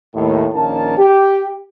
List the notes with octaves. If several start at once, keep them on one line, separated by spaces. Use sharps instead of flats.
D#2 A2
A#1 D#3 A#3 C#4 A5
G4